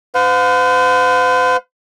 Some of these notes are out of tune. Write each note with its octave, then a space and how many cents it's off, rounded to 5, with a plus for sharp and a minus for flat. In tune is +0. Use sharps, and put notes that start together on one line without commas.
C5 -45 F5 +45